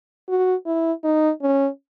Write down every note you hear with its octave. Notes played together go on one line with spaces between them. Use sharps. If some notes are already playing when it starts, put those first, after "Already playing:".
F#4
E4
D#4
C#4